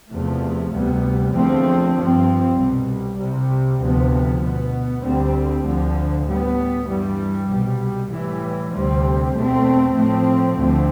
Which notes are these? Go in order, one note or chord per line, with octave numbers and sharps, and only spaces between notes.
E2 C3 F3 A3
D2 C3 G3 B3
E2 D3 F3 A3 C4
G2 F3 C4
C2 B2 G3
C2 C3 G3
D2 C3 F3 B3
B2 B3
D2 D3 G3 C4
D2 D3 F3
A2 G3 B3
G2 E3 G3
C2 B2 G3
A2 E3 G3
D2 C3 G3 C4
E2 B2 A3 C4
A2 F3 A3 C4
D2 D3 F3 A3 C4